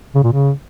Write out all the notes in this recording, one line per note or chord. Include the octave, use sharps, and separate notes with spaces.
C#3
A#2
C#3